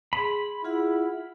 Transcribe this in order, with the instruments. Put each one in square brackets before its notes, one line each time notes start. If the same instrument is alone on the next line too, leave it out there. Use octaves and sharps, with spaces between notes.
[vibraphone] G#4 C6 [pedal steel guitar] B5
[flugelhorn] E4 [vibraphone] F4 G#4 F#5